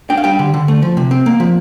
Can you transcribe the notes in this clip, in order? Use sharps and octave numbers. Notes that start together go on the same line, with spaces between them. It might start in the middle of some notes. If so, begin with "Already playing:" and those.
D4 G5
F5
G3 G5
D3
D3
A3
F3
C3
C4
A#3
F3